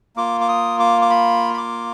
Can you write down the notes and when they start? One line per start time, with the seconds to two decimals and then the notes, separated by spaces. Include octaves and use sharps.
0.16 A#3 F4 D6
0.41 D6
0.48 D#6
0.80 D6
1.02 D6
1.10 B5
1.54 B5
1.57 D6